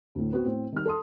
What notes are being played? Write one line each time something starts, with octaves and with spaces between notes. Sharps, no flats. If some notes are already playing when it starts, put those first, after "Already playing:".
D2 A2
B3 C4 F#4 B4
A2 C4
D#3 G3 F6
A4 A5 C6 D#6